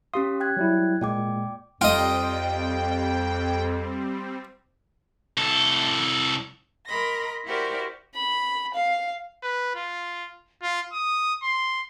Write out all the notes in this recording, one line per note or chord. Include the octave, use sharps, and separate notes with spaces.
C#4 G4 F5 C6 D#6
G5 F#6 G#6
F#3 G3 E4
A#2 G#3 A#3 D5 G5 D6
F2 G3 C4 F4 D#5 G5
C2 A4
A#4 D#5 B5 C6 A#6
E4 F#4 G4 A#4 C5 D5
B5
F5
B4
F4
F4
D#6
C6